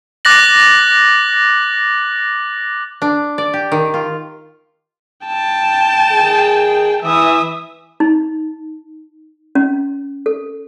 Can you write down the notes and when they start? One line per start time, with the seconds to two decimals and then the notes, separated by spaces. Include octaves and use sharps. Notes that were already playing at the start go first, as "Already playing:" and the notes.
0.25 D6 F#6 A6 A#6 F#7
3.02 D4
3.38 D5
3.54 G4
3.72 D#3
3.94 F4
5.27 G5 A5
6.12 D#3 G#4
7.03 E3 E5 D#6
8.00 D#4
9.55 C#4
10.26 A4